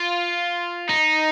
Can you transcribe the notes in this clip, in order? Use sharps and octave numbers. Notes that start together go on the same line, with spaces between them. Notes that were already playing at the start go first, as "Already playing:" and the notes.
Already playing: F4
D#4